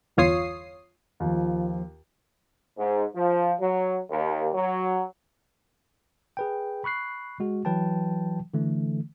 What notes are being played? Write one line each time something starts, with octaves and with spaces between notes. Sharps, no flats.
G1 E2 F4 C#5 D#6 C7
D#2 F3 F4
G#2
F3
F#3
D#2
F#3
G#4 B4 G5
B5 C#6 F#6 C7
G#3 F#4
E3 F#3 B4 G5 A5
D3 E3 A3